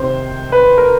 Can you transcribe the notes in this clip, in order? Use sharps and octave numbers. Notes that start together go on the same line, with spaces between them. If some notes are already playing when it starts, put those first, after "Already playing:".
Already playing: C3 D#3 C5
B4
A#4